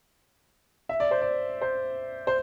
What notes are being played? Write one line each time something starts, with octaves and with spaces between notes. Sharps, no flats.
E5
D5
C5
D5
C5
C5